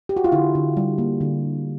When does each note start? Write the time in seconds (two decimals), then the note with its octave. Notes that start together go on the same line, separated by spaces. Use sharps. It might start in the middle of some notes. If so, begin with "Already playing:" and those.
0.09 G4
0.17 F#4
0.24 F4
0.32 D3 E4
0.55 D3
0.77 G3
0.98 A#3
1.21 D3